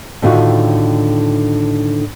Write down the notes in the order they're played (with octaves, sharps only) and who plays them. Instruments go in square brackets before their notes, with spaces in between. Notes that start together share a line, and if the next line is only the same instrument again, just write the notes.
[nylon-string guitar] A2 D3 D#3 F4 F#4